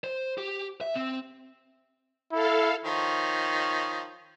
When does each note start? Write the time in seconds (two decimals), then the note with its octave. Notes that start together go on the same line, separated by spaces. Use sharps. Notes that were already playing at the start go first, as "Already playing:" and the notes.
0.04 C5
0.38 G4
0.81 E5
0.95 C4
2.32 E4 A4 F5
2.85 D#3 F3 C#5